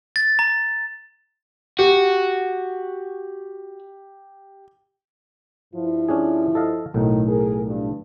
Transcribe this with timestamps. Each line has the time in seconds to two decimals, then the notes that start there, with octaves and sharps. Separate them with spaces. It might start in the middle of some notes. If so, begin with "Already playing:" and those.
0.16 A6
0.39 A#5
1.79 F#4 G4
5.74 G2 F3 E4
6.08 C#4 D4 G#4
6.55 A4 D#5 F5
6.94 B1 A2 D#3
7.28 G#4 A#4
7.67 G2 D4